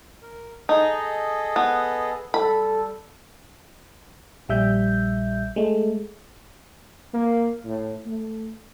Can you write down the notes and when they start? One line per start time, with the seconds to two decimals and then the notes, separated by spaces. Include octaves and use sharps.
0.22 A#4
0.69 D#4 G#4 A4 D#5
1.56 B3
2.34 G3 A4 B5
4.49 A#1 G3 E5 G6
5.56 G#3 A3
7.14 A#3
7.65 A2
8.06 A3